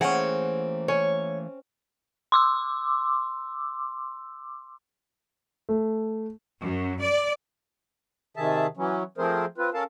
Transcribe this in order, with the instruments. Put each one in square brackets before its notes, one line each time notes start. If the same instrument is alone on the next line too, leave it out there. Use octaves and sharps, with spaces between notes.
[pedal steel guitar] E3 A3 A#3 [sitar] C4 [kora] C#4 G#4 [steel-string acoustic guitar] F#5
[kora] C#4 [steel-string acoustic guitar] C#5
[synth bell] C6 D6 E6
[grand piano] A3
[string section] F#2
D5
[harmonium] C3 D#3 G#4 E5 A5
E3 F#3 C#4
F3 A3 C4 G#4 A#4 C5
C4 F4 B4
C#4 A4 A#4 F5 A5